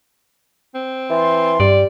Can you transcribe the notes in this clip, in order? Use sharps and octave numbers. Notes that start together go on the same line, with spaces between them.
C4
E3 C6
G2 G3 D5